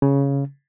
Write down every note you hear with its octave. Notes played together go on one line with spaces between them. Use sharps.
C#3